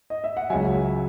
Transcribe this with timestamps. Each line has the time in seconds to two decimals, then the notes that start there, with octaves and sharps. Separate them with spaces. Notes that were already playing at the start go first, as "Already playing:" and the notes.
0.10 D#5
0.24 E5
0.37 F#5
0.50 C#2 C#3 F#3 E5 G#5